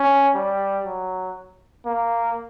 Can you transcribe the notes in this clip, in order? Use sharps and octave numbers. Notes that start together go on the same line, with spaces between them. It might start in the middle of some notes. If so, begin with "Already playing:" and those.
Already playing: C#4
G3
F#3
A#3